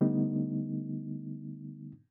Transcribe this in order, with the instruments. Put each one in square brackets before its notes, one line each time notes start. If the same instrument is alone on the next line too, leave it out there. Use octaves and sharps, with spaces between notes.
[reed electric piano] D3 G3 A3 B3 D#4